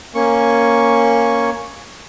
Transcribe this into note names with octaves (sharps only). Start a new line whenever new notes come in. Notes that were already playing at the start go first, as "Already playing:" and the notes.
A#3 C#4 C#6